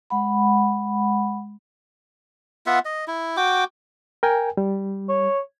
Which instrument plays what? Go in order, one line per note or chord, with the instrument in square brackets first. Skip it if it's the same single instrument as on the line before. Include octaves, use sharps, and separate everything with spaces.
[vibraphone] G#3 F#5 B5
[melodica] B3 F4 E5 F#5
D#5
E4
F#4 G5 D6
[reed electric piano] A#4 G5 G#5
G3
[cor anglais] C#5